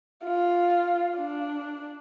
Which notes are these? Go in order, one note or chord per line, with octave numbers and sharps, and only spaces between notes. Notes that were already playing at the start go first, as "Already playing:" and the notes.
F4
D4